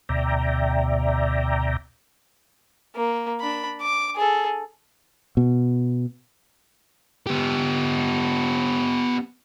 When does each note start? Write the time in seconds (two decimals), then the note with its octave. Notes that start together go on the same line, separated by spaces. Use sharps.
0.09 D2 B2 D5 E5 G5 A#5
2.96 A#3
3.40 D4 B5
3.82 D6
4.16 G#4 A4
5.37 B2
7.27 B3 G4